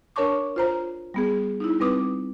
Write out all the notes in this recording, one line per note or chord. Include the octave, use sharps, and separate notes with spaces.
D4 A#4 C#5 A5 C#6 D6
F4 C5 A#5
G3 B3 G#4
D#4 E4
G3 C4 B4 D6 D#6